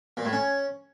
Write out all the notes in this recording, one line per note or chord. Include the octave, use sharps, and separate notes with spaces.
A#2
A2
C#4